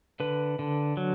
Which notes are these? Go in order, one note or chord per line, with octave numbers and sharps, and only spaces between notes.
D3 B4
D3
F#3